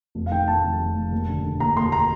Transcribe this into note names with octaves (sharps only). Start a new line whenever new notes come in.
F1
F5
D#3 G5
F1 A5
F1
F1
F1
D#2
D3
D3
D#2 A#5
D#2 C6
A#5